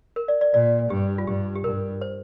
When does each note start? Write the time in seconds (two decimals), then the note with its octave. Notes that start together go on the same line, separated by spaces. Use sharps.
0.16 A#4
0.28 D5
0.41 D5
0.53 A#2 D5
0.90 G2 G4
1.18 F4
1.27 G2 G4
1.56 G4
1.64 G2 A#4
2.01 C5